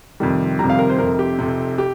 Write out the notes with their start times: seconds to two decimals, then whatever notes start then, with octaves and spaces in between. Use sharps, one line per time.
0.20 F2 C3 D#3 G3
0.59 F2 C3 D#3 G3 A#5
0.70 F5
0.79 A#4
0.90 C5
0.98 F1 F2 C3 A#4
1.19 G4
1.39 F1 F2 C3
1.78 G4